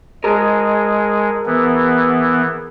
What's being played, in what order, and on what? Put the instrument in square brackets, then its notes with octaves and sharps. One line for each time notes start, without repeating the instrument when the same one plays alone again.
[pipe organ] G#3 [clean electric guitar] G#4 A#4
[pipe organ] E3 B3